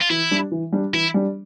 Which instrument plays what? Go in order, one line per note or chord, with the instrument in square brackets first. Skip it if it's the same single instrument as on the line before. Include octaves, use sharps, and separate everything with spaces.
[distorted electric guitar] F4
[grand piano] E3 [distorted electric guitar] E4
[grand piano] G3 D4
E3
G3 D4
[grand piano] E3 [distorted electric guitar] E4
[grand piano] G3 D4